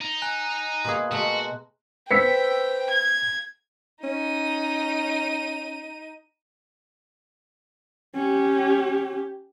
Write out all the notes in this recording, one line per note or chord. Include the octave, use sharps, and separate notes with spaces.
D#4
G#5 A#5 F#6
B2 A#3 G#4 C6
B2 G#3 A3 F#4
B4 C5 G5 E6 B6 C#7
G#6
C#4 D#4 D#7
C#4 G4